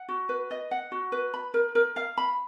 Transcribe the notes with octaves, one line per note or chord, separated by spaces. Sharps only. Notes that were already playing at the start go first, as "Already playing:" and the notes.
Already playing: F#5
F#4
B4
D#5
F#5
F#4
B4
B5
A#4
A#4
F5
B5